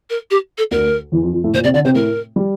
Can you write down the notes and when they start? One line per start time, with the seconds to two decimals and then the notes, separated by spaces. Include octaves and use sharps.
0.09 A#4
0.30 G4
0.57 A4
0.71 D2 D3 A#4
1.12 E2 E3
1.23 F2 F3
1.33 F2 F3
1.44 A2 A3
1.54 A#2 A#3 C5
1.63 C3 C4 D5
1.74 D3 D4 D5
1.85 C3 C4 C5
1.95 A2 A3 A#4
2.36 G3